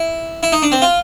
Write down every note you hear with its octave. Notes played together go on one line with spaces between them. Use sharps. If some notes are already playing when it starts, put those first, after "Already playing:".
Already playing: E4
E4
D#4
D4
C4
F4